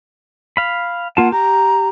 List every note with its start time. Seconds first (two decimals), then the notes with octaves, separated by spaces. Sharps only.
0.57 F5 B5
1.17 A#3 F4 F#5 A5
1.32 G4 A#5